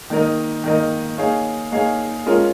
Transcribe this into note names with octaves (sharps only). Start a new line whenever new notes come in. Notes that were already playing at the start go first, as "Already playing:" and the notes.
D#3 A#3 D#4 A#4 D#5
D#3 A#3 D#4 A#4 D#5
A#3 D#4 G#4 C#5 F5
A#3 D#4 G#4 C#5 F5
G#3 C#4 F4 A#4